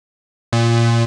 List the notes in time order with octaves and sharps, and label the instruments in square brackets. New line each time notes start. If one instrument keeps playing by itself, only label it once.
[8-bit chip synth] A#2